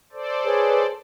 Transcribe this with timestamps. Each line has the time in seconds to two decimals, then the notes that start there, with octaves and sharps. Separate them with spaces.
0.12 A4 C5 D5
0.45 G#4 B4 C#5